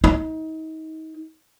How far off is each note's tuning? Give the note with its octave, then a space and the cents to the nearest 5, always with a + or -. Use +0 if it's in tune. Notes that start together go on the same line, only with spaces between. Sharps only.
D#4 +30